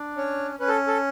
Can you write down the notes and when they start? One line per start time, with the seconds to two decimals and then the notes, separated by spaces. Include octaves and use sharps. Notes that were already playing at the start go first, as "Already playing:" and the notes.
Already playing: D4
0.16 C#4 C#5
0.59 C#4 B4
0.68 A4
0.87 A4